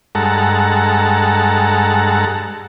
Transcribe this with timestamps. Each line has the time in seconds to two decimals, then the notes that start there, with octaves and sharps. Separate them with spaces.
0.15 G2 G#3 A4 F#5 A5 A#5